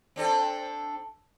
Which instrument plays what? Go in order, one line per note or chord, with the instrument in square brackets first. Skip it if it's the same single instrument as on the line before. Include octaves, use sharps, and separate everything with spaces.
[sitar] C4 D4 A4